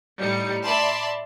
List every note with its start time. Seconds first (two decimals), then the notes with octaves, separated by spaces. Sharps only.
0.20 A2 G3 D#4 C#7
0.64 D5 E5 A5 B5 C6